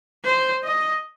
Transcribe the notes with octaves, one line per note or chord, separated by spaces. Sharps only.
C5
D#5